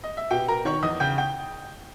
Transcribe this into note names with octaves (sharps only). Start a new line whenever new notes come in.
D#5
E5
B2 G4 G5
B2 A#4 A#5
D#3 C#5 C#6
E2 D#5 D#6
C#3 G5 G6
G5 G6